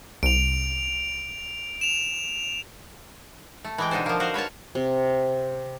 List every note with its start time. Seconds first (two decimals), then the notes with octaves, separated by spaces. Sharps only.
0.23 C2 D7 F7
1.81 E7 F7
3.65 A3
3.78 E3 G#3 G5
3.91 B2 D3 D#4 A4 C5
4.06 F3 A#3
4.20 F#4 C5 F5
4.34 B4 C#5 F5 A5
4.75 C3